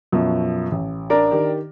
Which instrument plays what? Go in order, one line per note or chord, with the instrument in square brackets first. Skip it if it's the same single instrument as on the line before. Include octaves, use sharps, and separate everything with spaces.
[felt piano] F#2 B2 F3
A1
[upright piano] D4 A#4 D5
[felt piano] D#3 G4